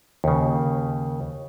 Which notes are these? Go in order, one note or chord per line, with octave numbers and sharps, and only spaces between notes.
D#2 C#3